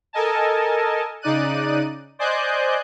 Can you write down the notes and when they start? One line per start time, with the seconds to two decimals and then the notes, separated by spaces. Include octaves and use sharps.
0.13 A4 A#4 D#5 G#5 A5
1.22 C#3 D#4 D5 F#6 D#7
2.19 C5 D5 D#5 G#5 F#6 G6